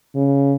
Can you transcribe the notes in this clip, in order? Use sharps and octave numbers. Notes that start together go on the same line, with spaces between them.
C#3